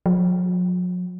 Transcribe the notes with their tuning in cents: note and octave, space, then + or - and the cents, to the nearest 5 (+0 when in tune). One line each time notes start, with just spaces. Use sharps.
F#3 -45